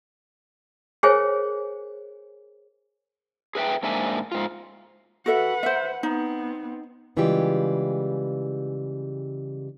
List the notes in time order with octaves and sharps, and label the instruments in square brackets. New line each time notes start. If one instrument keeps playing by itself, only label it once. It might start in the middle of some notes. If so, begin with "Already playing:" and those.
[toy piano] G#4 A#4 C5 C#5 G#5
[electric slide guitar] G#4 B4 E5 G5
G#2 A#3 D4 E5 G#5
G#2 F4
[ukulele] F#4 A4 E5 [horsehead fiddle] B4 F#5
[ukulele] C5 E5
[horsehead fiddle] B3 C4 [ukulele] D#4
[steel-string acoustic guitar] C#3 E3 G3 G#3 F4 G4